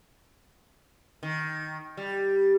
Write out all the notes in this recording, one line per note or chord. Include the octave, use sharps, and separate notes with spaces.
D#3
G3